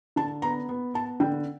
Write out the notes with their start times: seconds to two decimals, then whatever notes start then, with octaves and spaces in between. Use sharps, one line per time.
0.16 D3 A5
0.42 B3 A#5
0.69 B3
0.94 B3 A5
1.20 D3 G5